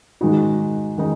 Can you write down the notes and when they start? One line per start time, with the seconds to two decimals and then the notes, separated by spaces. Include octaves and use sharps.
0.21 G#2 D#3 G#3 D#4 F#4
0.98 D#3 G#3 D#4